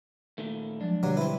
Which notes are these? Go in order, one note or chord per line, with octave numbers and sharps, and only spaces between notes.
A#2 D#3 A3
F3 F#3 G#3 D4
G2 B2 D3 F#3
C4 E4 B4